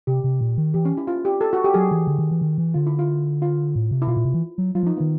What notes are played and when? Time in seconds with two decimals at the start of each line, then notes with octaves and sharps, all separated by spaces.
0.07 C3 G4
0.24 C3
0.41 A#2
0.57 D#3
0.74 E3 G4
0.85 C#4
0.97 E4
1.07 F4
1.25 G4
1.41 A4
1.53 F#4
1.64 G4
1.74 F#3 G#4
1.91 E3
2.07 D3
2.19 D#3
2.31 E3
2.41 D#3
2.58 E3
2.74 D3 F4
2.86 E4
2.99 F4
3.42 F4
3.75 A2
3.91 C3
4.02 E4
4.08 B2 F4
4.17 A#2
4.25 C3
4.34 E3
4.58 F#3
4.75 F#3 F4
4.83 F3 D#4
4.97 B3
5.00 D#3